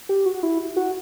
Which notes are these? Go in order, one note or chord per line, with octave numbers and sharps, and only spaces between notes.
G4
F#4
E4
F#4